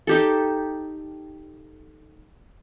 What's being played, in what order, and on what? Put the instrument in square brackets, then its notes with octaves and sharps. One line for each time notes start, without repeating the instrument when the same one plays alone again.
[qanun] D#4 G4 A4